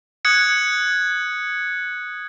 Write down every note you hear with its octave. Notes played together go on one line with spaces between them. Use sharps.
D#6 F#6 G#6 C#7